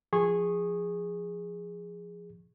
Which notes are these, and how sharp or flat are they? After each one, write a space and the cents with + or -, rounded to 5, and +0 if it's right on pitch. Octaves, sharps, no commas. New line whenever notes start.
F3 +0 G#4 -10 C#6 -20